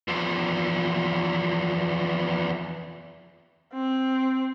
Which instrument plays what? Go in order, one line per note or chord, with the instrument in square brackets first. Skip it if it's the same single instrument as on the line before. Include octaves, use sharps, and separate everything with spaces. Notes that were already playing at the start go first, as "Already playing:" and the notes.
[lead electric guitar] E2 F3
[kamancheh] C4